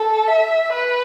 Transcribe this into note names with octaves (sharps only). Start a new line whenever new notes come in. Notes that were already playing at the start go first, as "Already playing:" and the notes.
Already playing: A4
E5
B4